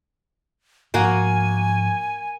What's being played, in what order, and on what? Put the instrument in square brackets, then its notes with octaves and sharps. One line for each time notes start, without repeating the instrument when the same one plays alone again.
[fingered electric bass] G#2 F3 [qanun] A#3 F#4 [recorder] G#5